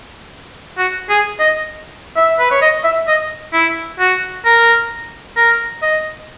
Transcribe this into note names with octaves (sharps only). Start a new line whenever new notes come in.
F#4
G#4
D#5
E5
B4
C#5
D#5
E5
D#5
E4
F#4
A#4
A#4
D#5